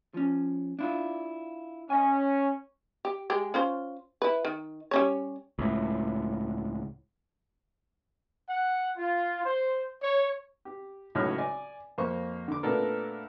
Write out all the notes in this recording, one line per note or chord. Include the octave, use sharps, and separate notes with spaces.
F3 C#4
D4 E4 F4
C#4 D#5 G#5
G4
G#3 G4
C#4 F4 C5
E4 B4
D#3
G3 C#4 C#5
C#2 A2
F#5
F4
C5
C#5
G4
C#2 A2 F#3 D#4 C#5 F6
D5 G#5
F2 A#3 C5 C#6
D3 D6
A#2 A3 B3 D4 A4 A#4